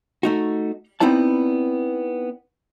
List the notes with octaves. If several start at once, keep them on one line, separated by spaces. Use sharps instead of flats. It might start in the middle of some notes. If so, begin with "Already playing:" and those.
A3 D#4 F#4
B3 C4 D#4 E4 D5 A5